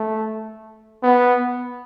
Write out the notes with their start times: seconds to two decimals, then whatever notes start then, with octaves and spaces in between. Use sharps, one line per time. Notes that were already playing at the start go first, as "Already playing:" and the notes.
Already playing: A3
1.03 B3